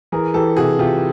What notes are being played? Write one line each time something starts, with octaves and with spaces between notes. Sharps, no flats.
E3 G#4 A#4
E3 G4 A4
C3 F#4 G#4
C3 F4 G4